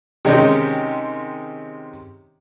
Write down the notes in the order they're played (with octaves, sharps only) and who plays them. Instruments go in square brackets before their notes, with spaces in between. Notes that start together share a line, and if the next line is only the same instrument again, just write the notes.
[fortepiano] C3 D#3 G#3 C#4 D#4 G4